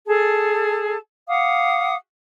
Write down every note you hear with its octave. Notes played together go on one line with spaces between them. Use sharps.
G#4 A4 A5
F5 F#5 D6 D#6